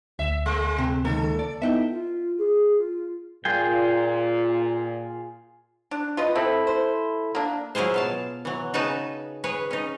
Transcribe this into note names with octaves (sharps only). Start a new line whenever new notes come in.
D2 E5
G#3
C3
C#2 D#3 A#3 A4
D5
B3 D#4 E4 E5 F#5 G5
F4
G#4
F4
A#2 F4 G#4 G5
D4
F4 B4 D#5
C4 E4 A4 B5
C5
A#3 D4
F#3 E4 F4 G#4 C5
B2 F5 A5
E3 F#3
C#3 D#4 F#4 B4 G#5 A5
G#4 B4 C#5
C#4 D#4